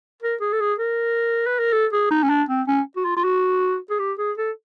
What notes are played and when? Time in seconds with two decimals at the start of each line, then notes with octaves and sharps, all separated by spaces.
0.22 A#4
0.41 G#4
0.53 A4
0.60 G#4
0.78 A#4
1.46 B4
1.59 A#4
1.73 A4
1.93 G#4
2.11 D#4
2.23 C#4
2.29 D4
2.49 C4
2.67 C#4
2.96 F#4
3.05 F4
3.16 F4
3.24 F#4
3.90 G#4
3.99 G4
4.19 G#4
4.37 A4